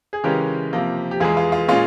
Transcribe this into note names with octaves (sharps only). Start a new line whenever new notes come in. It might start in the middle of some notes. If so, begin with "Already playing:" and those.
G#4
C#3 E3 G#3 C#4 G4 A#4
C3 F3 A#3
G4
E2 E3 G#3 F4 G#4
F4
F4
A#2 G#3 C#4 F4